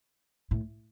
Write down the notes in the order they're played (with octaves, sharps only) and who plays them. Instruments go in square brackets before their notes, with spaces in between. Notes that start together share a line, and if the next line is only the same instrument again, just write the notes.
[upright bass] A2